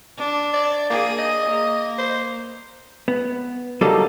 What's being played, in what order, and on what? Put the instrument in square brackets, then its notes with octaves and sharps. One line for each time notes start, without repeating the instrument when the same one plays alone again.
[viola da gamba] D4
[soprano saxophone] D5
[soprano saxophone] A#3 [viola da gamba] G#4
[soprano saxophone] D#5
[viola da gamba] A#3
[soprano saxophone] C5
[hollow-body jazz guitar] B3
D3 F#3 G3 A#3 D#4 A4